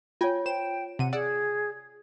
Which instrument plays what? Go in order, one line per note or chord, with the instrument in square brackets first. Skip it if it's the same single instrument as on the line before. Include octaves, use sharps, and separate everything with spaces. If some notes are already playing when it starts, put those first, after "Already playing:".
[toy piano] F4 C#5 [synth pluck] G5 G#5
[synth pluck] C5 E7 [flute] G5
[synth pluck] C3 D#7 [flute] F#5
[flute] G#4 [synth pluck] D5 F#5 E6